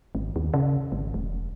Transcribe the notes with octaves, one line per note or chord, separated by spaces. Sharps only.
G#1
D#2
C#3
G#1
E1